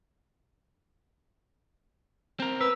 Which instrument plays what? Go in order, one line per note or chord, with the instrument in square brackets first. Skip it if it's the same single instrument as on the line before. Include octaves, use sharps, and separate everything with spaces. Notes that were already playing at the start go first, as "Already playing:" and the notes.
[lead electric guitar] C4 A#4
[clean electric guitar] B4 [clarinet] E6